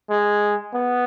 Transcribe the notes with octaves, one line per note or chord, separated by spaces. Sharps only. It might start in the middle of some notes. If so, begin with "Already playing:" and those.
G#3
B3